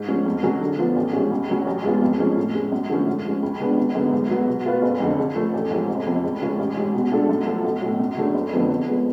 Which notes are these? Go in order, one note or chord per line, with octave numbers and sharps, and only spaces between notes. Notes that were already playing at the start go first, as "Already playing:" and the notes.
Already playing: G#2
F3 G#3 C#4
F2
C#3 F#3 C#4 G#4
D3
F3 B3 F4
A1
G#2 F3 G#3 C#4
C#2
C#3 F#3 C#4
A1
G#2 G#3 B3 F4
F2
F3 G#3 C#4 G#4
A2
G#3 C#4
F#2
D3 F3 A3 C#4
G#2
F3 G#3 C#4
C#2
C#3 G#3 B3 D4
G#1
F#2 D3 G#3 B3
G#2
F#3 B3
B2
A3 F4 B4 F5
F#1
F2 D3
C#3
F3 A3
A1
G#2 F3 A3
F1
F2 F3
C#2
C#3 G#3 C#4 F4
A1
G#2 G#3
B2
G#3 D4 F4 A4
F#2
F3 A3 F4 A4
B1
A2 F#3
F#2
C#3 F#3 A3 D4
F#1
F2 D3 F3 B3
F#1
F3 G#3 B3